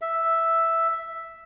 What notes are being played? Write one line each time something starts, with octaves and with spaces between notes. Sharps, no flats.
E5